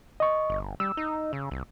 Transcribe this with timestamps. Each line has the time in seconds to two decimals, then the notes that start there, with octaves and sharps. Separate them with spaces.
0.20 D#5 C#6
0.50 G1
0.80 G3 E6
0.97 D#4
1.33 C#3
1.51 C2